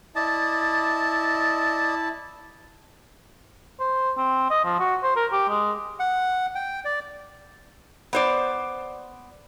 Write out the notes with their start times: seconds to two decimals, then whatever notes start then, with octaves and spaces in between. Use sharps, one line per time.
0.16 E4 D5 D#5 A5
3.80 C5
4.17 C4
4.50 D#5
4.65 F3
4.80 F#4
5.04 C5
5.16 A#4
5.32 G4
5.49 G#3
6.00 F#5
6.55 G5
6.85 D5
8.13 B3 C5 D5